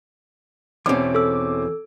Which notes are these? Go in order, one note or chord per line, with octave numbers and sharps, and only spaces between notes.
E2 B2 C4 C#4 D6
A4 E6